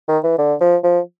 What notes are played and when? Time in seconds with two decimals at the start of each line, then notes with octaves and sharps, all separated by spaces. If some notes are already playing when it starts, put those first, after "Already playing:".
0.08 D#3
0.23 E3
0.38 D3
0.61 F3
0.84 F3